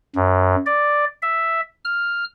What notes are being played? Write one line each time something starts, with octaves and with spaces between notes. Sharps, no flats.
F#2
D5
E5
F6